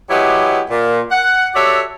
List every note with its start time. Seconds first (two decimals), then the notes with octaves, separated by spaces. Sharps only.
0.10 F#3 G#3 B3 E4 G4
0.70 A#2
1.11 F#5
1.55 F#4 G4 A4 C#5 D5 E5